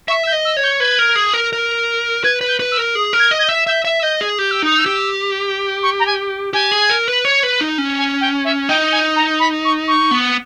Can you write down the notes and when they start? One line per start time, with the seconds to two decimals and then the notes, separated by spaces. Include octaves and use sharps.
0.08 E5 C#6
0.27 G6
0.32 D#5
0.44 E6
0.57 C#5
0.63 G6
0.80 B4 G#6
0.99 A#4
1.16 G#4
1.34 A#4
1.53 A#4
2.24 B4 G#6
2.41 B4
2.48 G6
2.60 B4
2.71 E6
2.77 A#4
2.95 G#4 D#6
3.13 A#4
3.19 G#6
3.31 D#5
3.39 G#6
3.43 G6
3.49 E5
3.67 E5 G6
3.85 E5
4.03 D#5 G6
4.21 G#4
4.38 G4 G6
4.51 E6
4.62 D#4 D#6
4.78 E6
4.86 G4
5.82 C#6
5.99 A#5
6.06 G#5
6.53 G4 G#5
6.72 G#4
6.90 A#4
7.08 B4
7.25 C#5
7.43 B4
7.61 D#4
7.78 C#4
7.97 G#5
8.21 G5
8.44 E5
8.69 D#4 G5
8.92 G#5
9.16 A#5
9.39 B5
9.64 C#6
9.87 C#6
10.11 B3